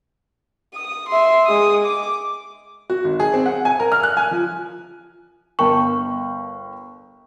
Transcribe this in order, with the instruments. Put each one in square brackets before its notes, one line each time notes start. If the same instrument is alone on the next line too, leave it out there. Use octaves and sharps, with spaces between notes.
[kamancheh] D#6
E5 C6
G#3 D#6
D6
[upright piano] F#4
G#1
G#4
C4
F#5
G#5
A#4
F6
F#6
G#5
F3
[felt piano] G1 G5 [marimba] A#4 A5 [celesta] C#6